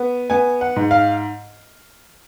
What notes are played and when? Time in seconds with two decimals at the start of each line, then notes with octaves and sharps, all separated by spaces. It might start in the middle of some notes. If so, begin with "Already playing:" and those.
Already playing: B3
0.30 B3 G#5
0.61 F#5
0.76 G#2
0.91 F5